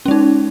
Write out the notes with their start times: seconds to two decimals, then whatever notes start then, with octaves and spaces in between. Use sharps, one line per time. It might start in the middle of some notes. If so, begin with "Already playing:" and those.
0.05 C#4
0.08 G#3
0.11 D#4